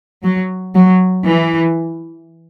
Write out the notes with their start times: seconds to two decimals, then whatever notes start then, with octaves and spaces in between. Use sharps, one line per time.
0.24 F#3
0.75 F#3
1.26 E3